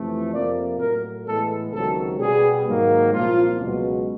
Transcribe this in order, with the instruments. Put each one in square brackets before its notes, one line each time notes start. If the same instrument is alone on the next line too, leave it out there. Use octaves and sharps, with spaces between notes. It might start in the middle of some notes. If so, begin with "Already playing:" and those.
Already playing: [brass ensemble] F2 C3 E3 A3
F2 C3 F3 A#3 D5
A2 F#3 A3 A#4
A2 E3 G#3 B3 A4
C#2 C3 D#3 F#3 A4
B2 G3 B3 G#4
G#2 D#3 F#3 A#3
C2 A#2 F3 A#3 F4
C#2 B2 F#3